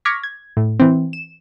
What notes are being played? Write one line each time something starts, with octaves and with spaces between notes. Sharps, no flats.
C#6 D6 F6 G#6 A#6 B6
G#6
A2
E3 C4
E7